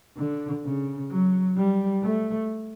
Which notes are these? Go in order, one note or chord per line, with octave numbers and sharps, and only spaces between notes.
D3
C#3
F#3
G3
A3